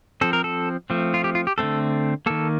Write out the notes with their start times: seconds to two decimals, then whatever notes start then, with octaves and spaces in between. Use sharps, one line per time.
0.21 F3 C4 A4
0.33 A#4
0.44 A4
0.90 F3 A3 C4
1.14 F4
1.24 G4
1.35 F4
1.47 G4
1.58 D3 A3 C4 A4
2.26 D#3 A#3 A4